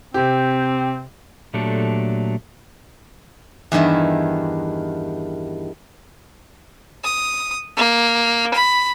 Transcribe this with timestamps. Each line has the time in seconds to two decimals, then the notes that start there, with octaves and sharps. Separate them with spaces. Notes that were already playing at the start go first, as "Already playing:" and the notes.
0.14 C3 C4 G4
1.54 A#2 F#3 A3 D4 G4 A4
3.72 E2 G2 D#3 E4
7.04 D#6
7.77 A#3
8.54 B5